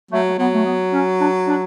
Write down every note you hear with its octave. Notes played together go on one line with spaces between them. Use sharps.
F#3 A3
A3
F#3 B3
A3
B3
C#4
D4
D4